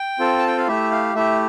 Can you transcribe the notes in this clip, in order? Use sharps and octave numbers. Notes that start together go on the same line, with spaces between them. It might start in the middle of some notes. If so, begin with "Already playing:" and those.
Already playing: G5
C4 F4 A4
A5
G5
F5
A3 E4 G4 E5
F5
A3 E4 G4 E5